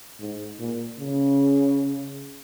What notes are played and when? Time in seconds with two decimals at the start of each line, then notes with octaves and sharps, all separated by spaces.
0.20 G#2
0.59 A#2
1.00 C#3